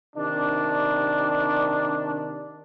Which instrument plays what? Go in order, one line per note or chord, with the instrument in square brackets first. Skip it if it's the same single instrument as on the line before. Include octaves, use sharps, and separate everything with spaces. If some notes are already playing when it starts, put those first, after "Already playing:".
[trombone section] C3 D#3 D4